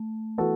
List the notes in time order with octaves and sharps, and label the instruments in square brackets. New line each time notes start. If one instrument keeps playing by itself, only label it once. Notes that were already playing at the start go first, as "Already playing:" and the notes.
Already playing: [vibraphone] A3
[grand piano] E3 B3 F#4 A4